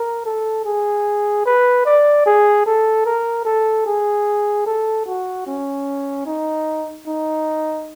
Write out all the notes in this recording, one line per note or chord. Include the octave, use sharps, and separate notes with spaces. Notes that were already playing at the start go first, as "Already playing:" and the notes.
Already playing: A#4
A4
G#4
B4
D5
G#4
A4
A#4
A4
G#4
A4
F#4
C#4
D#4
D#4